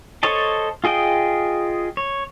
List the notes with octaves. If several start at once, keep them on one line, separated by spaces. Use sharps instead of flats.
A4 C5 C#5 D#5 A5
F4 G#4 D#5 G5
C#5